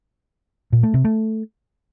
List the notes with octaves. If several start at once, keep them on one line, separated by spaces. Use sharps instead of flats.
A#2
A3
C3
A3